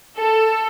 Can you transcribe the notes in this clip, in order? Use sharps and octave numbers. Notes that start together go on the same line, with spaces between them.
A4